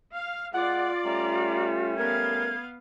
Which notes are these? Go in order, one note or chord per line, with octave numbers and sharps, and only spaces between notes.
F5
G#3 F4 D5 F#5
G3 A3 C#4 A#5
B3 A#4 F5 G#6